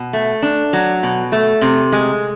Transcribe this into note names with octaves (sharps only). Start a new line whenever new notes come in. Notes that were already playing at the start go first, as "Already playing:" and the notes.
Already playing: B2
A3
D4
F#3
B2
A3
C3
G#3